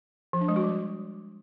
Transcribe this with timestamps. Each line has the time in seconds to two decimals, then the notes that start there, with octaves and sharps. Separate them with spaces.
0.33 F3
0.41 D4
0.48 G#3
0.56 F#4
0.64 G3